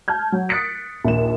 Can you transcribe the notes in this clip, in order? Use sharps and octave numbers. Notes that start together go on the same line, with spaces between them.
A5 F6 G6 G#6
F#3 F#4
D#6 F#6 A6 B6 C#7 D7
A#1 D#2 E7